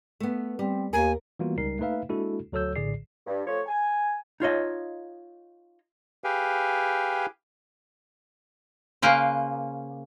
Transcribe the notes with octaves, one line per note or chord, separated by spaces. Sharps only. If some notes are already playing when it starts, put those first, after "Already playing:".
A3 B3
G3 C4
D#2 A#4 G#5
E3 G3 A#3 B3 F4 F#4
C#2 G3 D#4 A#4 C7
A3 A#3 D#4 B4 E5 F5
G#3 A#3 D4 E4 F#4 A4
D2 F#3 A4 C#5 E6 G6
A#1 A2 D3 G#4 D5 C7
G2
F3 A3 C#5
G#5
D#4 F4 C#5 D#5
G4 G#4 B4 F5 G5 G#5
C#3 A#3 B4 C5